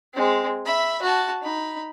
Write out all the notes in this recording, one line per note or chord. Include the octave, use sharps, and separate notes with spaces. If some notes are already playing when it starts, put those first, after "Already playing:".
G#3 C4
E5 B5
F#4 A5
D#4 B5